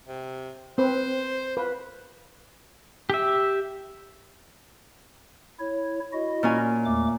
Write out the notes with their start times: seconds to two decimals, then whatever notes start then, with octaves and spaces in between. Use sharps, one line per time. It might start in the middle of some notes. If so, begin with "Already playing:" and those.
0.07 C3
0.78 C4 B4 C5
1.57 F4 B4
3.10 G4 E5
5.60 E4 C#5
6.12 E4 F#4 D#5
6.43 A#2 C#4 G#5
6.85 E2 A3 D6